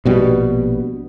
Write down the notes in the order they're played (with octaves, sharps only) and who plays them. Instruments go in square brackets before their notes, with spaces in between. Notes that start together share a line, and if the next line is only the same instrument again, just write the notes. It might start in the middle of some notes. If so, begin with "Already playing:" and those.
[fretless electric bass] A#1 B2 G3